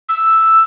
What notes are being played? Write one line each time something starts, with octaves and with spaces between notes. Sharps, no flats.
E6